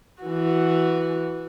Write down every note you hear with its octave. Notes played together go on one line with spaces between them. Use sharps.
E3 F#4